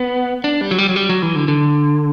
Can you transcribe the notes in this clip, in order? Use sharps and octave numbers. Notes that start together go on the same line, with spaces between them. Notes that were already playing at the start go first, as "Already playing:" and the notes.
Already playing: B3
D4
G3
F#3
G3
F#3
G3
F#3
E3
D3
D3